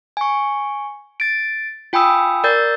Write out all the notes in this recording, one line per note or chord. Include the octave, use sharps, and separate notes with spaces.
G#5 C#6
A6 D7
F4 G5 G#5 B5 D#6 E6
A#4 D5 E6 G6 A6